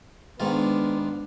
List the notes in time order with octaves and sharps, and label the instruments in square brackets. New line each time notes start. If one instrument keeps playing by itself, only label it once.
[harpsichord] G#2 D#3 F4 [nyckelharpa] B3 D4